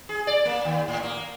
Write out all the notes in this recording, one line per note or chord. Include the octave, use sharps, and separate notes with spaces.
G#4
D5
A#3
D#2
A2
A#3